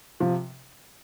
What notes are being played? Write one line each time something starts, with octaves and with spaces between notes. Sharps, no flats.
C3 F3